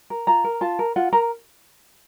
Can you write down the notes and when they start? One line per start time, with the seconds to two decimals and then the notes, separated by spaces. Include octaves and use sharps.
0.10 A#4
0.27 F4 A#5
0.44 A#4
0.61 F4 A5
0.79 A#4
0.96 F4 F#5
1.13 A#4 A#5